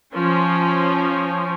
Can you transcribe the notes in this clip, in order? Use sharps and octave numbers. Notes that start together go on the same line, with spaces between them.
F3 C#4